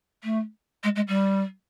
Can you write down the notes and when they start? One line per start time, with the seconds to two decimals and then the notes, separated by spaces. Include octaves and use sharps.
0.23 A3
0.84 G#3
0.96 G#3
1.08 G3